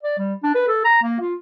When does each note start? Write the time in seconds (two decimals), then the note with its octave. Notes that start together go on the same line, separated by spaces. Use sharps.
0.03 D5
0.18 G3
0.43 D4
0.55 B4
0.68 A4
0.84 A#5
1.03 A#3
1.20 F4